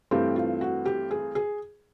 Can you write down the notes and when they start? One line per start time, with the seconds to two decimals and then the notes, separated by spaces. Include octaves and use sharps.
0.11 G2 E3 A3 C4 G4
0.36 F4
0.61 F#4
0.86 G4
1.11 G#4
1.35 G#4